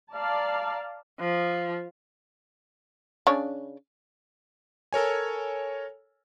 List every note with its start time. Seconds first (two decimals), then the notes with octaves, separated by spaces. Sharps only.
0.13 D5 F5 A5 A#5
1.20 F3
3.27 C#3 D4 C#5
4.93 A4 A#4 C#5 G#5